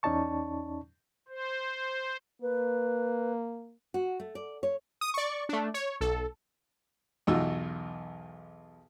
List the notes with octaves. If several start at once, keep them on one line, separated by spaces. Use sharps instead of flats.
E2 C#4 D#4 D5 A5 C#6
C5
A#3 B4
F#4
A3
D5
C#5
D#6
D5 C#6
A3 D4
C#5
B1 A4
B1 E2 D#4 F4 F#4 E6